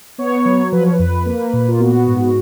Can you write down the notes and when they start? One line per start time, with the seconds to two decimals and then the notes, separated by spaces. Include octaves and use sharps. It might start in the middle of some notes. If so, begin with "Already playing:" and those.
0.18 B3 C#5
0.45 F#3
0.72 F3 B4
0.83 C#5
0.93 B4
0.99 F2
1.26 A#3
1.53 A#2
1.68 F4
1.80 B3 F#4
2.07 G#2